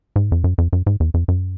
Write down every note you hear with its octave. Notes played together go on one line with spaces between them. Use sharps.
G#2
F2
F#2
F2
F#2
G#2
E2
F2
F#2